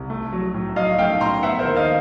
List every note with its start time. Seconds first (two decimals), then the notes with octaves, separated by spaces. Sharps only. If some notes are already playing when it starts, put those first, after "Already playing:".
Already playing: C2
0.10 A3
0.33 F#3
0.54 A2
0.76 F#3 D#5 F5
0.99 A3 F5 G5
1.21 A2 A#5 C6
1.43 B3 E5 F#5
1.59 A#4 C5
1.65 D#2
1.76 D#5 F5